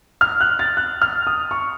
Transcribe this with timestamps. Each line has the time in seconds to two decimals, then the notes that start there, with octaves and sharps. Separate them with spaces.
0.21 F6
0.41 F#6
0.59 A6
0.77 F#6
1.02 F6
1.27 D#6
1.51 C#6